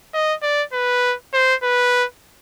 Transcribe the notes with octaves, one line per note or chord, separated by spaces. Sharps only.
D#5
D5
B4
C5
B4